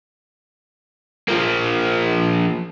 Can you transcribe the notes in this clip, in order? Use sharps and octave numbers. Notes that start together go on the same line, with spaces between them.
F3 A#3